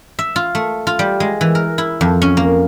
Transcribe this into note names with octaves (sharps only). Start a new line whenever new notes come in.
E5
F4
A3
F4
G3
G#3
E3
A#4
E4
F2
C#4
A#3